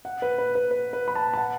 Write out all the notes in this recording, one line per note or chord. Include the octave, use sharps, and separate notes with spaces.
F#5
B4
B4
B4
B4
B4
B5
A5
A5
F#5